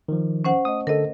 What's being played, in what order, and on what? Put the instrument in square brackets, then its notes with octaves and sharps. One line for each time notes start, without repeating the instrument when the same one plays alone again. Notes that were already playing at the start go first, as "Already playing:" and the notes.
[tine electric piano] D#3 F3
[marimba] C#4 C5 F#5
[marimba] A3 D#5 [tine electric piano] D#6
[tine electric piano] D3 A4 [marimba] A#4 D#5